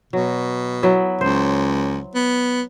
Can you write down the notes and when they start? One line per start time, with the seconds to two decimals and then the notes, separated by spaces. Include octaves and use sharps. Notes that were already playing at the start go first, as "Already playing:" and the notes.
0.13 B2 F#3
0.83 F#3 B3 E4
1.21 C#2 C5
2.15 B3